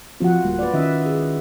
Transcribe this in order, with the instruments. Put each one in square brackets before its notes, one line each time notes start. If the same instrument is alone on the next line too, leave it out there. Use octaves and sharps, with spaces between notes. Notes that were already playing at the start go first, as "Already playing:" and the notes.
[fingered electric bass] F3 C4 [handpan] F4 F#4 F#5
[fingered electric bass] D1 G3 A#3
[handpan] B4 D5
[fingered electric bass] D#3 C#4 [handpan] E4 D#5 E5
[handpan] G#4